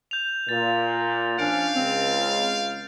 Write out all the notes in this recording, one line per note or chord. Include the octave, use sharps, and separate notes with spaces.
G6 F7
A#2 A6
F3 C#4 D4 F5 D7
C#2 C4